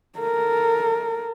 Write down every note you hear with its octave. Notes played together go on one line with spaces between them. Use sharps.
A4 A#4